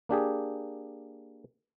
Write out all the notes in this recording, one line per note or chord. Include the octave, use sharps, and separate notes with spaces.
A#3 D4 G4 G#4